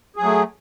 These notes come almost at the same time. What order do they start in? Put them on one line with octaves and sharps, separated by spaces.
G#4 F#3 A3